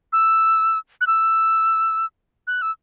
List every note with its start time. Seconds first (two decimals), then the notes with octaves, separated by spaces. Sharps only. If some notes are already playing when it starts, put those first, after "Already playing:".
0.13 E6
1.01 F#6
1.07 E6
2.47 F#6
2.62 E6